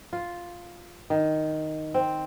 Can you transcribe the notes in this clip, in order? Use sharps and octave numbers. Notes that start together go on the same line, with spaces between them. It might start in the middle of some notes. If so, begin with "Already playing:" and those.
F4
D#3
C4